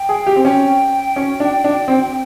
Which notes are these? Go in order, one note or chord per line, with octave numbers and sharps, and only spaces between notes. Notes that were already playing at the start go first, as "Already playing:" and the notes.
Already playing: G5
G#4
G4
C4
C#4 G5
C#4
D4
D4
C4